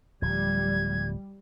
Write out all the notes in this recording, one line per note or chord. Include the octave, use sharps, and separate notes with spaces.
D1 F3 G3 G#6